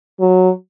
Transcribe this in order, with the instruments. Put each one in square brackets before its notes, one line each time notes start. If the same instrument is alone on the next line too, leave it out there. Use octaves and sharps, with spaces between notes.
[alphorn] F#3